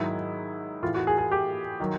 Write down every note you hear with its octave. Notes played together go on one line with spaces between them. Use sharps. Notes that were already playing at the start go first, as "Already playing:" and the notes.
Already playing: G#2 D#3 F#3 E4
A2 E3 F4
F#4
G#4
G#4
G4
D#3 F#3